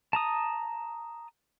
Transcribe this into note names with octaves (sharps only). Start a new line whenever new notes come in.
A5 A#5 D#6